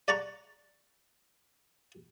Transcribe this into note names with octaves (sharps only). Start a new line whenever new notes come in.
D5 F#5 A5 A#5 C#6